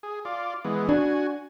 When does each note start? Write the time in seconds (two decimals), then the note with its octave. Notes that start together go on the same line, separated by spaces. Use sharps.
0.03 G#4
0.25 F4 D5
0.65 E3 G#3 B3
0.89 D4 F#4 G#5